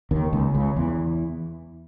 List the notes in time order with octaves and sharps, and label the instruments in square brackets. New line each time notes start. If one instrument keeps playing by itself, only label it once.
[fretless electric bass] D#2 D#3
C#2 C#3
C#2 C#3
E2 E3